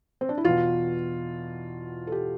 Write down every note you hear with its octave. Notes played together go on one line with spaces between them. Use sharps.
C4
D4
E4
E2 B2 F4
A4
G4